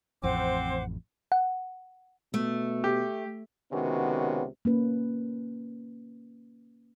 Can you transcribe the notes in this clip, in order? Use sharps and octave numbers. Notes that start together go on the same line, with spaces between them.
A1 F2 C4 C5 F#5 D6
F#5
B2 A3
G4
C#2 C3 D#3 B3 C#4 F#4
A#3 C#4 B4